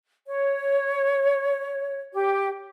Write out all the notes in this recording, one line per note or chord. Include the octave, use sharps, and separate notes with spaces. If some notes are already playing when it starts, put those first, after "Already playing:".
C#5
G4